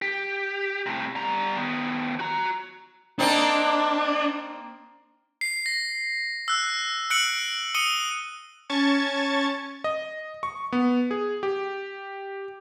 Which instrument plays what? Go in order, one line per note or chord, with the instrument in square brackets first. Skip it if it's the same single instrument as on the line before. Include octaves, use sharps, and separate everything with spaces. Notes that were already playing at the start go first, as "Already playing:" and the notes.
[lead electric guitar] G4
A2 C3
G3 A#5
D#3 B3
F#4 A#5
[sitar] A#3 C4 D#4 [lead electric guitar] D4
[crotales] C7
A#6
E6 F#6
E6 F#6 C#7 D7 F#7
D#6 C#7 D#7 G7
[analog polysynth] C#4 A5 C#6 G#6 A6
[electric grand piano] D#5
C#6
B3
G#4
G4